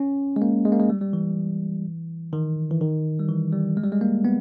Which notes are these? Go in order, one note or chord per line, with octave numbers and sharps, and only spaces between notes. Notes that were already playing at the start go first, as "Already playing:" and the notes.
Already playing: C#4
G#3
A#3
G#3
A#3
G#3
G3
G3
E3
D#3
E3
D#3
G3
E3
G3
G#3
G3
G#3
A#3
B3